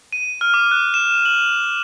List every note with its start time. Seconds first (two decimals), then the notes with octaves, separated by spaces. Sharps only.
0.13 D#7
0.41 F6
0.54 D6
0.71 F#6
0.94 E7
1.25 F#7